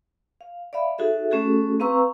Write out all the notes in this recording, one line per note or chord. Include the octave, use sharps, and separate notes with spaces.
F5
D5 E5 F5 B5
D#4 F#4 G#4 A4 E5
A3 C#4 F#4 G#4 A4
C4 B4 F5 A#5 C#6 E6